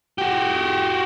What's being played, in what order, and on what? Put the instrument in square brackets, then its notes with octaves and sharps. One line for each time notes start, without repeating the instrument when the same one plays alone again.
[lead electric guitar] F#4 G4